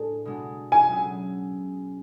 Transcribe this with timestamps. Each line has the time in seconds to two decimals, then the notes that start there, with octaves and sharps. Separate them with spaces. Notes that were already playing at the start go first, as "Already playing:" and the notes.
Already playing: A2 G#3 D4
0.25 B2 G#3 D4
0.72 G#5
0.88 B2 F#3 C#4 E4 G#4